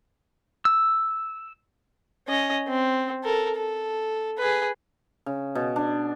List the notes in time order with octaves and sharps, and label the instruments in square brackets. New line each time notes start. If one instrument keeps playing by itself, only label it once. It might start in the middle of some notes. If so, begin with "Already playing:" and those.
[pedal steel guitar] E6
[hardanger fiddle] C#4 D#5
C4
A4 A#4
A4
G#4 B4
[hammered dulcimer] C#3
B2
D4